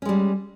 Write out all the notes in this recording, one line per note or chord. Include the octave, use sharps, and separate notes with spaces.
G3 G#3 C#4